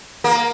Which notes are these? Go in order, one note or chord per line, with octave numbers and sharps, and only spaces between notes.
A#3